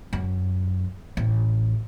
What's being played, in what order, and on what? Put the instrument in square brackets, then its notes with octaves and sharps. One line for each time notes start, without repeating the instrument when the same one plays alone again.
[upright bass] F#2
A1